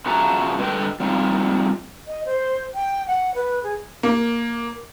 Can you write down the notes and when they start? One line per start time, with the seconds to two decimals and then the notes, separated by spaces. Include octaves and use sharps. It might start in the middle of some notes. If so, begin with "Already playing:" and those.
0.06 C#3 F3 F#4 E5 A#5
0.58 G2 D3 B4 D#5 G5
1.00 F3 G3 C4 D#4 F4
2.08 D#5
2.25 C5
2.75 G5
3.07 F#5
3.35 B4
3.63 G#4
4.03 A#3